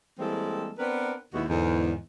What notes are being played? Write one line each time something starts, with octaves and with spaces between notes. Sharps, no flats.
E3 G3 G#3 A#3 C4 A4
B3 C4 D4 A#4 B4
D#2 B2 G#3 E4 F#4
E2 G#2 D3